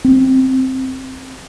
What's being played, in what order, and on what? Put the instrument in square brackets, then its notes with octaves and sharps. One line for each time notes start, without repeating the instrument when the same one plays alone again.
[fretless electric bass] C4